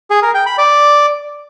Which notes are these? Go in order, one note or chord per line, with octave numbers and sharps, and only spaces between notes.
G#4
A#4
G5
B5
D5